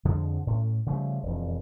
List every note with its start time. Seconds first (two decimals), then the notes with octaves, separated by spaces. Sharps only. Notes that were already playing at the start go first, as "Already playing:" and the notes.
0.05 F2 D3 F3 G#3
0.47 A2 C#4
0.86 C#3 F3 G3 A3
1.23 E1 F2